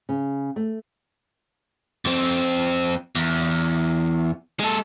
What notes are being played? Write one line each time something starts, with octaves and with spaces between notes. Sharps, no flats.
C#3
A3
F2 C4
E2
G#3 A4